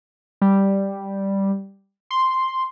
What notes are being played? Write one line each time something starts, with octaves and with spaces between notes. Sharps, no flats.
G3
C6